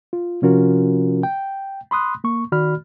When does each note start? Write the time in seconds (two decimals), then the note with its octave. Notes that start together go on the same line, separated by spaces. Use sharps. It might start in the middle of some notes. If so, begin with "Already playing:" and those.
0.13 F4
0.42 C3 F3 C#4 F4 F#4 A#4
1.23 G5
1.91 B5 C6 D#6 F#6
2.24 A#3 C#6
2.52 D#3 F#4 D5 B5 F6